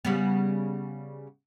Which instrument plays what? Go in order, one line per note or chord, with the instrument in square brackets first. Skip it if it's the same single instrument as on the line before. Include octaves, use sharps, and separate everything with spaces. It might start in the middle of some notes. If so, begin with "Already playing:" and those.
[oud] C#3 G3 B3